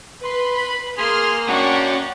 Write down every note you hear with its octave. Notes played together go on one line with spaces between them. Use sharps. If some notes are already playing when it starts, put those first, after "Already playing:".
B4 C6
B5
A#3 G#4 C6 F6
C#4 D4 F#4 F#5 G5 C#6